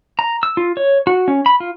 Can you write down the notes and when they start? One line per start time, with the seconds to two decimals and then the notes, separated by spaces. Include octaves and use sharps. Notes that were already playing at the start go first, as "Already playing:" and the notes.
0.19 A#5
0.43 E6
0.57 F4
0.77 C#5
1.07 F#4
1.28 C#4
1.46 B5
1.60 F4